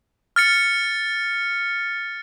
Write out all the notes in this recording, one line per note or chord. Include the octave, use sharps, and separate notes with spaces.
F6 A6 C#7